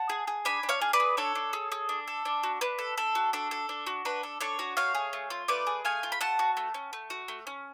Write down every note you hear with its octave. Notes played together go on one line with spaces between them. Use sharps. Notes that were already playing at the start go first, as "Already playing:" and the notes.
Already playing: F#5 A5
G#4
G#4
D4 G#5 B5
D4
C#5 F5
G#4
B4 D5
G#4
D4 A4 C#5
D4
G#4
G#4
D4
A4
D4
F#4
D4 B4
A4
D4 A4
F#4
D4 A4
A4
D4
F#4
D4 B4
A4
D4 A4 C#5
F#4
A3 C#5 F5
G#4
A3
F4
A3 B4 D5
G#4
A3 F5 G#5
F4
B5
A3 F#5 A5
F#4
A3
C#4
A3
F#4
A3
C#4